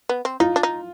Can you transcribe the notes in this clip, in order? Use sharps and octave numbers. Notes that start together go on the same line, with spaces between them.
B3
C4
D#4 F4
D4
D#4